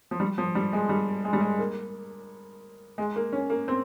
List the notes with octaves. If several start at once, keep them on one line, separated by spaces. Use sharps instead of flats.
F3
G3
F3
G3
G#3
G3
G#3
G3
G#3
A#3
G#3
A#3
C#4
A#3
C4